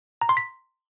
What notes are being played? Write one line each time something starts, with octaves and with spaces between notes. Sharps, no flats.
A#5
C6
B6